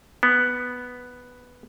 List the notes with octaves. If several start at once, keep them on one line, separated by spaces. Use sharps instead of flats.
B3